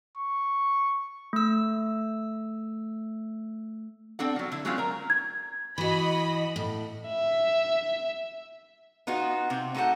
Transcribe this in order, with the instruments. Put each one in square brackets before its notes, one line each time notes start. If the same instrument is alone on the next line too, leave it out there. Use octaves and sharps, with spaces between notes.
[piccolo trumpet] C#6
[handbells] A3 E6
[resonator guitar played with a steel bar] C4 D4 A4 F#5
F3 F#3
D3 E4
F#3 G#3 A3 C4 C#4 F4
A#4 A#5
[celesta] G#6
[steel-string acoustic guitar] E3 F#4 [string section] D#5 B5
[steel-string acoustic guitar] A2
[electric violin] E5
[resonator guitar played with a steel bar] B3 D#4 F4 F#4
C3 C4
A3 D#4 F#4 A4 F#5